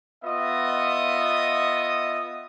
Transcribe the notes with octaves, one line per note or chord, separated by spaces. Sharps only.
B3 F4 D#5 E5 D#6